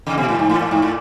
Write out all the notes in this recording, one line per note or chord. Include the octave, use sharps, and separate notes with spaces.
C#3
B2
A2
G#2
A2
A2
G#2
A2